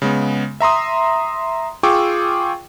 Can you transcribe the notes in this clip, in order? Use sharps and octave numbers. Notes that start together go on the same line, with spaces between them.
C#3 G#3 B3
E5 A#5 C6 D#6
F4 G#4 G5 C#6 D6 E6